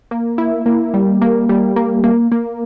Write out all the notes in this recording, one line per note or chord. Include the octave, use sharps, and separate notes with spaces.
A#3
E4
A#3
G3
A#3
G3
A#3
A#3
A#3